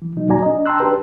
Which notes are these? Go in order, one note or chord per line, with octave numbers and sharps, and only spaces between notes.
E3
B2 F#3 D#4
D#2 A#2 F#4 D5 G#5 A#5
D4 D#5
G5 A5 A#5 C6 E6 F#6
D4 G4 B4